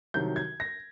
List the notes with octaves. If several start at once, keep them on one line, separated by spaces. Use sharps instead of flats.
C2 C3 D#3 F#3 G6
G#6
A#6